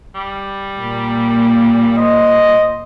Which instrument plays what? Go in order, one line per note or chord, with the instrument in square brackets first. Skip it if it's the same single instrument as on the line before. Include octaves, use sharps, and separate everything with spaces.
[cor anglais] G3
[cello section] A#2
[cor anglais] C5 [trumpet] D#5